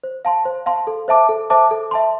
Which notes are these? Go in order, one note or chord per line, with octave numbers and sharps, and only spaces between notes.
C5
F5 A5 C6
C5
F5 A5 C6
A4
C5 E5 A5 D6
A4
C5 E5 A5 D6
A4
E5 A5 C6